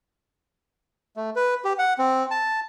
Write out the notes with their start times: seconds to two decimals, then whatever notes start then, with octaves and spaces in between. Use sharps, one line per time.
1.17 A3
1.36 B4
1.65 G4
1.79 F#5
1.99 C4
2.31 A5